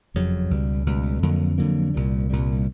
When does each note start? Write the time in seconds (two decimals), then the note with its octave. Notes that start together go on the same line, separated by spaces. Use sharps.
0.14 F#1 F2 C#3 F#3
0.51 C#2 B2 G3
0.86 C#2 B2 G3
1.23 F2 D3 F#3 A#3
1.58 F2 D3 F#3 A#3
1.94 C2 A#2 G3
2.30 C2 A#2 G3